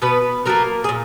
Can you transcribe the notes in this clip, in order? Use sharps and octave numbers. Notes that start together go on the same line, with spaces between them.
B2 B3 B4
F#3 A3 A#3 A#4
G#4
A#2